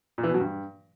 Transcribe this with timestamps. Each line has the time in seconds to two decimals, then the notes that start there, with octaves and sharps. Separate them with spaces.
0.18 A#2
0.23 E3
0.29 B2
0.34 F#3
0.40 G2